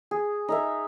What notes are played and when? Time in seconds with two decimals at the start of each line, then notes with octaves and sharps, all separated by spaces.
0.11 G#4
0.48 D#4 A#4 E5